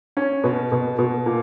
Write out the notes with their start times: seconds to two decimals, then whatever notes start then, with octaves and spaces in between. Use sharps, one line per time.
0.17 C#4
0.44 B2
0.72 B2
0.98 B2
1.26 A#2